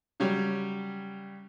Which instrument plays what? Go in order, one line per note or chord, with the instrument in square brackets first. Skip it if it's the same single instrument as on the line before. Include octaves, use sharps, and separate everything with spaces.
[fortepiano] C#3 F#3 G3 G4